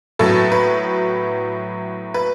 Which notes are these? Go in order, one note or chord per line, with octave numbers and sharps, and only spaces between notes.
A2 F#3 B3 A4
B4
B4